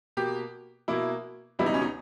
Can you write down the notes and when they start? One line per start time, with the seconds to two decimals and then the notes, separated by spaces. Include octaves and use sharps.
0.17 B2 A#3 G4
0.88 B2 A#3 E4
1.59 C#2 B2 G3 B3 E4
1.66 D#4
1.74 C#4
1.82 D#4